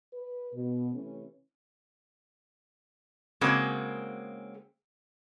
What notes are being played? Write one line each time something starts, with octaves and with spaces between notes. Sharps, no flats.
B4
B2
C3 E3 A3 C#4
C#3 G#3 A#3 C4 F#4 G#4